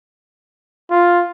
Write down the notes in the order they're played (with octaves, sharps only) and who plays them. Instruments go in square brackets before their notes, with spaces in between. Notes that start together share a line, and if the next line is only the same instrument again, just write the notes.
[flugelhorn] F4